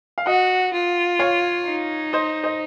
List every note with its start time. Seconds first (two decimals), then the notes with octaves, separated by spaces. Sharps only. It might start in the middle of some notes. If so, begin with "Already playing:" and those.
0.18 F5
0.26 F#4 D#5 F#5
0.73 F4
1.19 C#5 F5
1.66 D#4
2.13 C5 D#5
2.44 C5 D#5